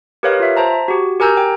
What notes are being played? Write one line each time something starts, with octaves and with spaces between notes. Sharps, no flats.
G4 A#4 B4 C#5 D#5 F5
F4 E5
C5 A5 A#5
F#4 G4
G4 A#4 G#5 A#5 E6 G6
G5